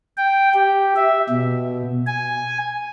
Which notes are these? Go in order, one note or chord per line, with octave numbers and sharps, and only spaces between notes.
G5
G4
E5
B2
G#5